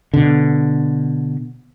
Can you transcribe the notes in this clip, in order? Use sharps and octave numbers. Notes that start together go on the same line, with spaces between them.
B2 D3